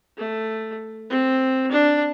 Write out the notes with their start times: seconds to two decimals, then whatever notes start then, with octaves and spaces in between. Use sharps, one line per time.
0.18 A3
1.10 C4
1.72 D4